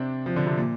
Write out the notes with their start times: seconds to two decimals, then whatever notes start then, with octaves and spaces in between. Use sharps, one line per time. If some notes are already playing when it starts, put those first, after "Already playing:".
Already playing: C3 C4 D4
0.26 F3
0.36 D3
0.47 C3
0.57 A#2